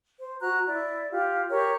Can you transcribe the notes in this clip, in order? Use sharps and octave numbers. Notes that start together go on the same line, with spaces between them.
C5
F#4 A#5 F#6
E4 D5
F4 G4
G4 A#4 C#5